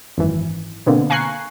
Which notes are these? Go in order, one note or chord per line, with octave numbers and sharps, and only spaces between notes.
G#1 F#2 E3
B2 D3 A#3 C4
F5 G#5 A#5 C#6 F#6 C7